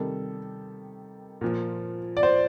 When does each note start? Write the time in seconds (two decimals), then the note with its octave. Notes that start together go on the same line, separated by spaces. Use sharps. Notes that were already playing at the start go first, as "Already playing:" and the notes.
Already playing: C3 D#3 G3 A4
1.41 A#2 F3
2.17 D5
2.23 C5